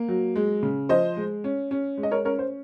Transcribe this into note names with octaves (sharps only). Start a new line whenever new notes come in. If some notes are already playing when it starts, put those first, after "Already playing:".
Already playing: A#3
F#3
G#3
C#3
F3 C5 D#5
G#3
C#4
C#4
G#3
D#5
A#4 C#5
C#4 A#4 C#5
C5